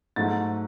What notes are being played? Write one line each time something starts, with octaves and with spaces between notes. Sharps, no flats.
G#2 F#3 A3 A6